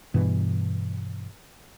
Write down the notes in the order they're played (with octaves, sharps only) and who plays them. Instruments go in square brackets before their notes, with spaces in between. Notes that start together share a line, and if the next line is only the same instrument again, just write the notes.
[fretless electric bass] G2 B2 E3